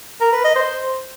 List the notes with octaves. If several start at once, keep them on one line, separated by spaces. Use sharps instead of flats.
A#4
B4
D#5
C5